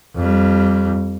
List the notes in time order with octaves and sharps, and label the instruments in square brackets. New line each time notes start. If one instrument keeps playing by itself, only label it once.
[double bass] F2 G3